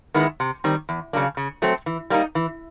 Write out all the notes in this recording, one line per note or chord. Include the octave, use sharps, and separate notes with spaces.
D#3 G#3 B3 E4
C3
D#3 G3 C4
E2
C#3 F#3 A#3 D4
C#3
F#3 A3 C4
E3
G3 A#3 D#4
E3